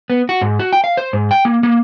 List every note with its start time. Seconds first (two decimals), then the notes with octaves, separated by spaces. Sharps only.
0.10 B3
0.29 F#4
0.41 G#2
0.59 F#4
0.73 G5
0.84 F5
0.97 C5
1.13 G#2
1.31 G5
1.45 A#3
1.63 A#3